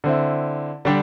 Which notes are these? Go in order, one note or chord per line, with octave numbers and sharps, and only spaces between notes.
D3 C4 E4
D3 G3 D4 G4